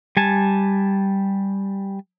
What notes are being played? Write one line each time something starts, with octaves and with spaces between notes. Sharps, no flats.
G3 G#5 A5